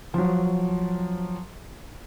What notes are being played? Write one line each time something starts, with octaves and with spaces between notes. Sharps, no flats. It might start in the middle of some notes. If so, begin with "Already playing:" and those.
F3 F#3